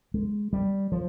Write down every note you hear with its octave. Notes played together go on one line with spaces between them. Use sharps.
G#3
G3
F3